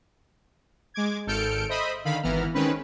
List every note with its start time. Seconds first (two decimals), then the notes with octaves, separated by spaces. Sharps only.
0.94 G#3 D6 G#6
1.27 G#1 A4 F6 G6 C#7 D7
1.69 C5 D#5 E5 B5 D#6
2.05 D3 D#3 F5 B5
2.22 G#1 E3 B3 A#5 F6
2.54 D#3 G#3 C4 C#4 B4